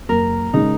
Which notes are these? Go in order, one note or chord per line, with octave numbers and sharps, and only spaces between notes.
F#1 A#4
C#3 G#3 D#4